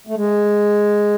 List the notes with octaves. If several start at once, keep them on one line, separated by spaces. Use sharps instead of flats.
A3
G#3